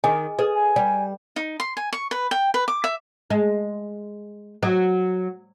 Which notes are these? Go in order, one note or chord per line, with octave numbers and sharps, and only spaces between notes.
D#3 G#4 D#5 G#5
G#4 A4 B4 D#5
G#5
G3 D5
D#4
C6
G#5
C#6
B4
G5
B4
D6
E5
G#3
F#3